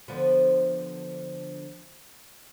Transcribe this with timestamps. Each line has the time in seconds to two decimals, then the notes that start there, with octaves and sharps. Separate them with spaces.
0.08 D3 F3 B3